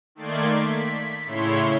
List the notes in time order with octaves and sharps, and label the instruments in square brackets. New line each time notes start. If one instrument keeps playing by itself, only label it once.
[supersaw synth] D#3 A3 A#3 D5 C6 G#6
B6
A2 C#3 E4 C#5 C6